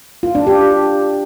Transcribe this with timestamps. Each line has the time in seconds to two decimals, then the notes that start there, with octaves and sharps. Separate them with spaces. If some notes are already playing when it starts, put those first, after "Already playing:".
0.23 F4
0.35 D4
0.47 G4